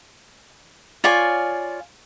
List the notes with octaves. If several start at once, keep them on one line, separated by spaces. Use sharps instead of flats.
F4 C#5 D5 G#5